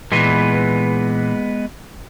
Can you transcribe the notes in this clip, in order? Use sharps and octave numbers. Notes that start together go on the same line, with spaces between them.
A#2 E3 G#3 B3 B4